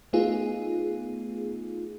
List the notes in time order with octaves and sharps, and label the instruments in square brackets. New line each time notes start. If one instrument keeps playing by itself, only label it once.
[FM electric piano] A3 B3 D#4 F4 G#4